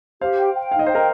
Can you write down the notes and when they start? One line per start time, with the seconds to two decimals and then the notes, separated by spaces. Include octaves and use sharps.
0.21 G4 C5 F5
0.38 G5
0.55 G5
0.72 D#4 F5
0.79 D#5
0.87 C5 G5
0.95 A#4 D#5